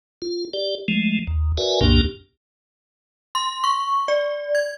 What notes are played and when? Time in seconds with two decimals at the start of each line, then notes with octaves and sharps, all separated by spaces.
0.22 F4
0.53 G4 D5
0.88 F3 G#3 A3
1.27 D#2
1.58 F#4 A#4 B4 D5 E5 G#5
1.81 C2 F#2 A#2 A#3 D4 G4
3.35 C6
3.64 C#6
4.08 D5
4.55 G#6